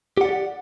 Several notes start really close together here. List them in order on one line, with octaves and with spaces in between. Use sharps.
G4 F#5 D5